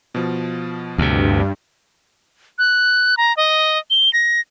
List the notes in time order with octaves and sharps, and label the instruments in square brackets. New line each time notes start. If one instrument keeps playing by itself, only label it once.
[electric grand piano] B2 F3
[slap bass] D2 C3 [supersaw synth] G2
[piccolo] F#6
A#5
D#5
G7
A#6